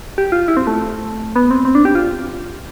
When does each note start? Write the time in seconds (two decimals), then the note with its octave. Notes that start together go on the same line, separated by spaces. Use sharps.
0.18 G4
0.32 F4
0.48 E4
0.57 C4
0.67 A3
1.36 B3
1.51 C4
1.65 C4
1.75 D4
1.85 G4
1.95 F4